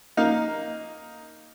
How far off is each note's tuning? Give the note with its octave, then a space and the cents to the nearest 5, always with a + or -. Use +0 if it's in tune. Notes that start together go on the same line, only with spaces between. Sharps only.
A#3 +0 D#4 +10 F5 +5